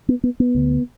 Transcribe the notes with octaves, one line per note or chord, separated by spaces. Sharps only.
B3
B3
B3
D2 D3